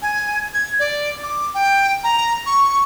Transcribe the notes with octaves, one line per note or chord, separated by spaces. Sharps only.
G#5
G#6
D5
D6
G5
A#5
C#6